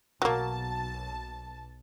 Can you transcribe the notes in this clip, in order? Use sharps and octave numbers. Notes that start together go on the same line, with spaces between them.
B1 F#3 A#3 A5